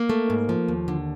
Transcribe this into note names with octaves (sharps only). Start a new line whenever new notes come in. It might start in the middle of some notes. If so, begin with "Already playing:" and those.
Already playing: A#3
A3
G#2
F3
D#2
D3